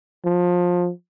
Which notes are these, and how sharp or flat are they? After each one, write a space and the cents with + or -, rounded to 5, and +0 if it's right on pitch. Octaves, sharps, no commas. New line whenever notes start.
F3 +25